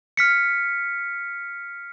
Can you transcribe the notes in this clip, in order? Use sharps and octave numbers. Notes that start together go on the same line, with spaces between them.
F6 B6 C#7